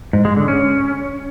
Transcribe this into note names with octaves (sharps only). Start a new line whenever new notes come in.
G#2
G#3
D3
C#4